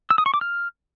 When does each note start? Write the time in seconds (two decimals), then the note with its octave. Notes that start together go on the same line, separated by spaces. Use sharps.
0.10 E6
0.18 D#6
0.26 C#6
0.34 D6
0.41 F6